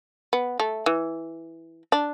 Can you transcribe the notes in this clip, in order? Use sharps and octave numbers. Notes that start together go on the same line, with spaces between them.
B3
A3
E3
D4